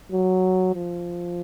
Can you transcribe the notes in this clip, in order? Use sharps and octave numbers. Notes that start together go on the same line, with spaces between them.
F#3
F3